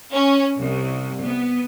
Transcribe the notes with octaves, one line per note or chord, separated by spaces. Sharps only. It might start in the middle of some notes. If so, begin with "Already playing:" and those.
C#4
C2
B3